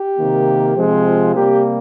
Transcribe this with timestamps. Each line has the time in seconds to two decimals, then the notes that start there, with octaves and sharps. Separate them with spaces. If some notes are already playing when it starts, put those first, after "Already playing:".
Already playing: G4
0.17 C3 D#3 A#3
0.76 C3 F3 G#3 C4
1.05 F4
1.35 C3 G3 A#3 G4